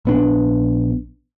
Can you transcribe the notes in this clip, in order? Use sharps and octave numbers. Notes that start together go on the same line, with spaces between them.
A#1 B3 D4